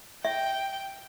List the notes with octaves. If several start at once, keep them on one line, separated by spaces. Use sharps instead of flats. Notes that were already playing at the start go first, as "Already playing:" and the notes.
E5 G5